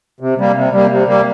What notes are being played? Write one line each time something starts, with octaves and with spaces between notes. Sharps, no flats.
C3
G3 A#3
C3
G3 A#3
C3
G3 A#3